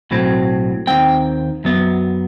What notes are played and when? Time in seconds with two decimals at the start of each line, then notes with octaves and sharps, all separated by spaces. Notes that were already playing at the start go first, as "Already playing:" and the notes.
0.11 B1 A2 F#3 C4
0.87 D#2 D#3 A3 C4 G5
1.64 F#2 F#3 B3